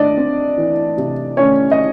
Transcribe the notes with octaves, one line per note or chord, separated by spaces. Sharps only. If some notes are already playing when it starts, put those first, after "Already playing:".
Already playing: A3 D4 D5 D#5
C4
E3
C3
A3 C#4 C#5
D#5